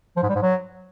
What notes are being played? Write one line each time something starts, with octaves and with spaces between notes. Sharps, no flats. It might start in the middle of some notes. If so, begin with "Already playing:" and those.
F3
G#2
G3
G#2
F#3